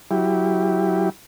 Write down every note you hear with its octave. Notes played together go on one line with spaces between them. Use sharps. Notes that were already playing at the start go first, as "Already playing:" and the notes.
F#3 E4 G4